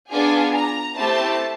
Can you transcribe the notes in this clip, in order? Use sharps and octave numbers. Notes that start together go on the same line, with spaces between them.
B3 D4 F4 G#4 G#5
A#5
A3 C4 E4 G4 A5